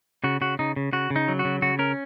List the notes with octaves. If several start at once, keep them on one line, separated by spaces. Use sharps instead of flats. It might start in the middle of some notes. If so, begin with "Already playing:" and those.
C#3 F#4
C#3 F#4
C#3 D#4
C#3
C#3 F#4
C#3
D#4
F#3
F#4
C#3
C#3 F#4
C#4 A#4